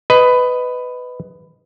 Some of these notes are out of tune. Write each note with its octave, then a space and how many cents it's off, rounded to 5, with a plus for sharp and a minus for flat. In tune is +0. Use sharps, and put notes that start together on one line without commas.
B4 +15 D#5 +0